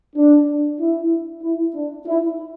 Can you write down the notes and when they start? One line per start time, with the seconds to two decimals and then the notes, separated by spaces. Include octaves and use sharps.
0.16 D4
0.79 E4
1.42 E4
1.74 D4
2.06 E4